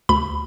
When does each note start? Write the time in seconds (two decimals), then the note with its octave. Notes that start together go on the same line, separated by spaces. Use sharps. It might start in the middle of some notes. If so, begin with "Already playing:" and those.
0.09 D2 B5